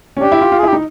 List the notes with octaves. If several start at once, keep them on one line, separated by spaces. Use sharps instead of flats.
C#4
D4 G4
E4
F4
F4
G#4
E4 G4
D#4